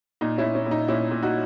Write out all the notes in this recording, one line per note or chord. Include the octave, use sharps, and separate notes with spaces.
A#2 D#4
C#4 E4
A#2
C#4
A#2
D#4
A#2 C#4 E4
A#2
D#4 F#4